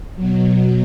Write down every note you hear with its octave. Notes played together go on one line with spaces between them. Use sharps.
B2 F#3